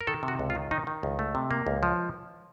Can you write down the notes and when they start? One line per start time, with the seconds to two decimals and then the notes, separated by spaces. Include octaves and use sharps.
0.01 A#4
0.07 D#3 A4
0.23 C3
0.28 F#4
0.39 C#2
0.50 F4
0.55 D#3
0.71 D#3 D#4
0.87 D#3
1.03 C#2
1.19 A3
1.35 C3
1.51 A#3
1.67 C#2
1.83 F3